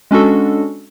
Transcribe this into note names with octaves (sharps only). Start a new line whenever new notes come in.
G#3 C#4 D4 F#4 A4